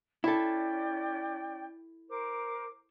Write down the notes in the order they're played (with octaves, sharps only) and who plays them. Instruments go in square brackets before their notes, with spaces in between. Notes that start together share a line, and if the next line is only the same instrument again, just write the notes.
[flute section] C#4 D5 G5 [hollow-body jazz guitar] E4 A4
[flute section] A#4 C5 D6